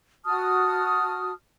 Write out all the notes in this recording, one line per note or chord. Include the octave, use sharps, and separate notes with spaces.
F#4 A5 D#6 F6